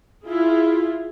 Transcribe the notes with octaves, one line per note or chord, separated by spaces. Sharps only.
E4 F4 G#4